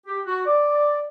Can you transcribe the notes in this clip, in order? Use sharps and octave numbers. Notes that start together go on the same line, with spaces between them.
G4
F#4
D5